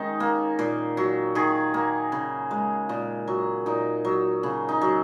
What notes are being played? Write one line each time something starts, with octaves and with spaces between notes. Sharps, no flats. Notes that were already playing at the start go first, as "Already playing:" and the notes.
Already playing: D#3 G#3 C#4 D#4
A#3
A#2
F#3
D#3 G#4
A#3
C#3
G#3
A#2
F#3
A#2 D#4
F#3
C#3
D#4
F#3